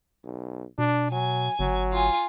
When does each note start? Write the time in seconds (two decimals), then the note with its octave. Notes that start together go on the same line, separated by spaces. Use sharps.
0.24 B1
0.78 B2 D4
1.12 F#3 G#5
1.59 G1 F#3
1.92 F4 G#5